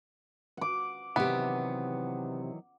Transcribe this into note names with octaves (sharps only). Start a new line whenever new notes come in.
F#5 D6
C3 D#3 E3 F#3 B3 G4